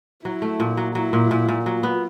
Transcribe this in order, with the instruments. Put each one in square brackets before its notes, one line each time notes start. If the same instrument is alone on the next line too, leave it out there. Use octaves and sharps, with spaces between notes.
[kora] F#3 [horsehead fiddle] E4
[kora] A3
A#2
F#3
[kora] F#3 [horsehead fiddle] E4
[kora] A#2
A#2
A#2
[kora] F#3 [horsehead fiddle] F4
[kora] B3